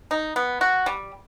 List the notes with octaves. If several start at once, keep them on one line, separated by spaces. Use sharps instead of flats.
D#4
B3
F#4
G3